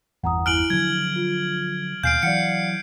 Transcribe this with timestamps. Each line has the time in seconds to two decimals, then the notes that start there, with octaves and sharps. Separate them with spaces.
0.24 G1 E2 E3 F#5 A#5 D#6
0.46 E4 G#5 F6 F#6 D7 F#7
0.70 D3 F3 F#3 G#6
1.16 F4
2.04 D#2 B2 F5 G#5 F6 G6 C7 D7
2.23 E3 F#3 D5 F5 F#5 C#7